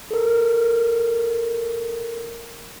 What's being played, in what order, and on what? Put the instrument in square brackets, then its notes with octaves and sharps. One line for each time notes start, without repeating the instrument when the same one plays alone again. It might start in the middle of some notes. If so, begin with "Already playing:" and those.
[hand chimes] A4 A#4